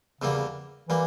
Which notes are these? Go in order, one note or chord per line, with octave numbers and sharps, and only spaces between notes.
E2 C#3 E3 G3 A#3
E3 G3 A#3